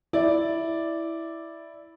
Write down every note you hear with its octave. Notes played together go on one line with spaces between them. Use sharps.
E4 D5